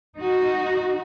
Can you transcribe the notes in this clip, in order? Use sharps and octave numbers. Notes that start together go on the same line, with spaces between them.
D#4 F#4